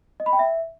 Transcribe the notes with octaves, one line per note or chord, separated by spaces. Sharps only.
D#5
B5
G5
E5